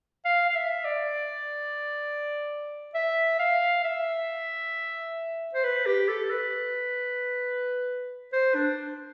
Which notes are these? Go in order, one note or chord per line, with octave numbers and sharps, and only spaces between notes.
F5
F5
E5
D5
E5
F5
E5
C5
B4
G4
A4
B4
C5
D4